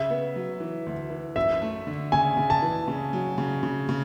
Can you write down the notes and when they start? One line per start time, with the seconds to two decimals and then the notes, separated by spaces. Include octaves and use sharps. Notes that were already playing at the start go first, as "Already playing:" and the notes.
Already playing: C#3 E5
0.10 B3
0.36 F#3
0.60 E3
0.86 D2
1.10 E3
1.36 F#2 E5
1.62 A3
1.87 D3
2.12 C#3 G#5
2.37 C#3
2.50 A5
2.62 E3
2.88 C#3
3.13 F#3
3.38 C#3
3.63 C#3
3.89 C#3